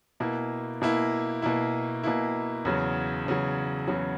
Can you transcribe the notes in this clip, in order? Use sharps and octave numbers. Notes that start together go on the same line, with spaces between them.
B2 A#3 E4
B2 A#3 E4
B2 A#3 E4
B2 A#3 E4
E2 C#3 F#3
E2 C#3 F#3
E2 C#3 F#3